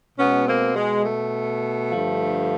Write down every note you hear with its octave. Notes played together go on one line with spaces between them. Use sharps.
B2 G#3 B3 C#4
A#3 C4
G#3
A3
G2 D3 F3